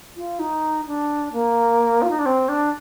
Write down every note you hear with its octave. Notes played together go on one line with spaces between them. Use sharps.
F4
D#4
D4
A#3
F4
D#4
D4
C4
D4